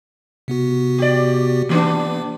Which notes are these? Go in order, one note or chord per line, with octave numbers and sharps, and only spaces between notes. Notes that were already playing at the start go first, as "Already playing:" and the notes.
C3 B3 F#4
G4 D5
E3 A#3 B3 D4